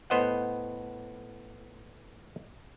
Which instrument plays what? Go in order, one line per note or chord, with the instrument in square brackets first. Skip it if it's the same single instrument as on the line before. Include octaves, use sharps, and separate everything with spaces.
[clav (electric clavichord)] A2 B3 C5 D#5 F#5